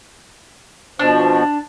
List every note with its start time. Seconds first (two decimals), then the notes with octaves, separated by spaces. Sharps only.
0.99 B2 F3 D4